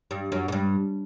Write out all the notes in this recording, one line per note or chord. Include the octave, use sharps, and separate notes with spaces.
G2
F#2
G#2
G2